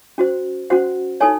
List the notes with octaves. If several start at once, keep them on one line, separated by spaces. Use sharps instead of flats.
C#4 F#4 C5
C#4 F#4 C5 F#5
D#4 A4 C#5 G#5